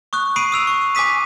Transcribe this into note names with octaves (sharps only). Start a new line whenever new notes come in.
C#6 D#6 F#6
B5 D#6 C7 D7 D#7
D#6 E6 F7
C#6
G#5 D6 D#6 B6 D#7